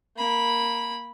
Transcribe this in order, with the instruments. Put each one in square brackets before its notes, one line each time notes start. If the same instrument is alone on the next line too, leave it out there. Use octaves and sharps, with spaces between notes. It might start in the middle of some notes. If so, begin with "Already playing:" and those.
[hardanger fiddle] A#3 B5